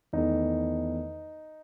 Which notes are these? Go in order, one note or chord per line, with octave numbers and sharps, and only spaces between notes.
E2 D#3 A3 D#4